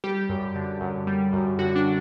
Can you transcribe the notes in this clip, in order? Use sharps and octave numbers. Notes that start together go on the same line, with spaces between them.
G3 G4
F#2
D3
F#2
G3
F#2
D3 F#4
D4